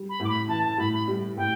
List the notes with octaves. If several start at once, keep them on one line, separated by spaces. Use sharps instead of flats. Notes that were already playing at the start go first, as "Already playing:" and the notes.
Already playing: G3
B5
A2 D6
B5
E3 A5
A5
A2 B5
B5
G3
A2 G5